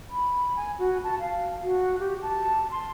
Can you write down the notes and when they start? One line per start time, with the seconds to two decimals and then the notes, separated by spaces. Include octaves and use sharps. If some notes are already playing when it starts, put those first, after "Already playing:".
0.10 B5
0.56 G#5
0.79 F#4
1.03 A5
1.20 F5
1.62 F#4
1.99 G4
2.22 A5
2.71 C6